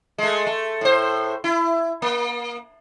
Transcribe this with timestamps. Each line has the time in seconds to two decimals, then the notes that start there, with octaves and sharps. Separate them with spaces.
0.18 G#3 A3
0.47 A3
0.81 A2 C5
1.44 E4
2.02 A#3